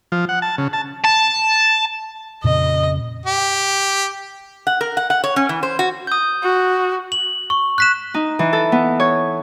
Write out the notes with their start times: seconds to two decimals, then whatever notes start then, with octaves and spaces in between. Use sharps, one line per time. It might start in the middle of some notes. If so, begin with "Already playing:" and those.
0.12 F3
0.29 F#5
0.42 A5
0.58 C#3
0.73 A5
1.04 A5
2.44 F2 A#2 C#3 D#5
3.26 G4
4.67 F#5
4.81 A#4
4.97 F#5
5.10 F#5
5.24 C#5
5.36 C#4
5.49 E3
5.63 C5
5.79 F#4
6.07 D#6 G6
6.43 F#4
7.12 F#7
7.50 C#6
7.78 F#6 B6 E7
8.14 D#4
8.39 E3
8.53 A4
8.72 B3
9.00 C#5